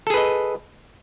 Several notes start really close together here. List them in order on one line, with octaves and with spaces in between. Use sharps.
A4 G#4 B4 D#5